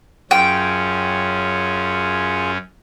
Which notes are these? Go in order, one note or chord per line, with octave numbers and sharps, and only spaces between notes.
F#2 C#4 F4 G#4 G5